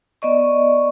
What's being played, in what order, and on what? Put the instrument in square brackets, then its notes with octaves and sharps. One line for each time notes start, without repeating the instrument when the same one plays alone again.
[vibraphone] B3 D5 D#5 C#6